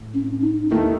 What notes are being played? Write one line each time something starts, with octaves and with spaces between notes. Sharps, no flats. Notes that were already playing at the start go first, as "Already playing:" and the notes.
Already playing: A2
C#4
D#4
D#2 D#3 A3 E4